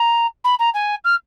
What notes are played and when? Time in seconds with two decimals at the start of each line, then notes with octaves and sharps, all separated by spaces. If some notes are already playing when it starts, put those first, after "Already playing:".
Already playing: A#5
0.44 B5
0.59 A#5
0.74 G#5
1.04 F6